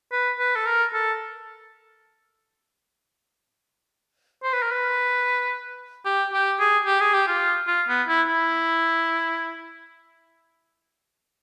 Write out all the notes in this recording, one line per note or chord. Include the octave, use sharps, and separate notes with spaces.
B4
B4
A4
A#4
A4
C5
B4
A#4
B4
G4
G4
G#4
G4
G#4
G4
F4
F4
B3
E4
E4